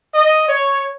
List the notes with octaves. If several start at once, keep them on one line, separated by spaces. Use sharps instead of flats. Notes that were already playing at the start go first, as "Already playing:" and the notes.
D#5
C#5